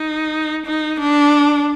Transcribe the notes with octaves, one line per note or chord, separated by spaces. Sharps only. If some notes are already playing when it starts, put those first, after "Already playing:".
Already playing: D#4
D#4
D4